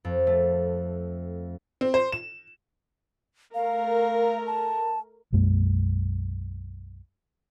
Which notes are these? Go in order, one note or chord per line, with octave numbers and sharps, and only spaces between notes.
F2
A3
C4
C5
E7
A3 A#4 F5
A5
B1 F#2 G#3 A#3